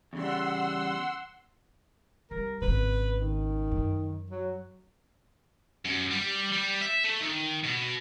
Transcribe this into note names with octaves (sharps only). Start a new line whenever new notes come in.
E2 C#3 G3 F#5 C6 E6
C2 A#4
G#1 C#3 B4
D#3
F#2
F#3
F#2
G3
G3
E5
A3
D#3
B2